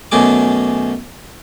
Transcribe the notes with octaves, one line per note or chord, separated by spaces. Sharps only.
F#2 B2 A3 G#4 D6